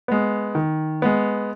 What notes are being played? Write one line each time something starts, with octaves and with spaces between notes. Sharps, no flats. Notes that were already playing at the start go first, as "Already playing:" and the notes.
G#3 B3
D#3
G#3 B3